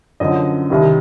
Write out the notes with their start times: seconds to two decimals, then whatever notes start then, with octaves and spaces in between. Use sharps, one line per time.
0.20 F#2 D3 F3 D#5
0.70 C2 C3 D#3